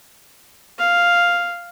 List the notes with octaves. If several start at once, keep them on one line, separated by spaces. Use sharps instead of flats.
F5